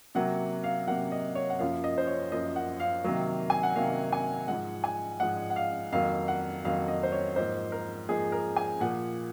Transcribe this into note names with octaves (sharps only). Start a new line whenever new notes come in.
C3 F#3 A#3 F#5
F5
C3 F#3 A#3 F#5
D#5
C#5
F#5
F#2 F3 A#3 F5
D#5
C5
C#5
F#2 F3 A#3 D#5
F#5
F5
C3 D#3 F#3 A#3
G#5
F#5
C3 D#3 F#3 A#3 F5
G#5
G#2 F3 G#3 F#5
G#5
G#2 F3 G#3 F#5
F#5
F5
F2 D#3 F#3 A#3 F5
F#5
F2 D#3 F#3 A#3 F5
D#5
C5
C#5
G#2 F3 A#3 C5
A#4
G#2 F3 A#3 G#4
A#4
G#5
A#2 F3 A#3 F#5